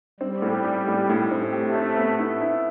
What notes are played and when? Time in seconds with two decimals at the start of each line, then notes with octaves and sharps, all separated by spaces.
0.20 G3 C4
0.42 A2
0.65 G4
0.87 A2
1.09 A2
1.31 C4
1.52 A3 G4
1.76 C4
1.97 B3
2.19 E4
2.41 E4